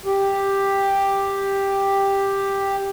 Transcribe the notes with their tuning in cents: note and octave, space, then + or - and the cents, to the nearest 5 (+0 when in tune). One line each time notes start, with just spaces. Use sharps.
G4 +5